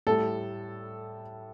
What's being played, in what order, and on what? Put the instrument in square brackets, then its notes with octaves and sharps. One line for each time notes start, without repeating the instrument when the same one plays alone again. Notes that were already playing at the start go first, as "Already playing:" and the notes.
[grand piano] A2 G3 A4